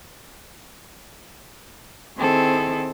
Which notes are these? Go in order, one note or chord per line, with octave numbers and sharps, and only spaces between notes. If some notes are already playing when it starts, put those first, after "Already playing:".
D#3 C4 E4 G#4 A4